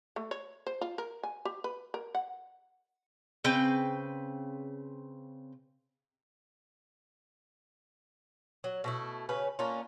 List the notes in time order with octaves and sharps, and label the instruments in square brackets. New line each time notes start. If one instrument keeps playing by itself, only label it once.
[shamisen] A3
C#5
C5
F4
A#4
G#5
G4
B4
A#4
F#5
[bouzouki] C#3 C4 B4 G5
F#3
B2 A3 E4
C#3 C#4 B4
A#3 C#4 D4 F4